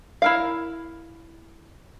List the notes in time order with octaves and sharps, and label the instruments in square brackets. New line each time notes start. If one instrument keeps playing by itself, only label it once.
[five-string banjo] E4 A#4 F5